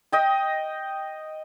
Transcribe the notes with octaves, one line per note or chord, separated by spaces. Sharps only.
D#5 G5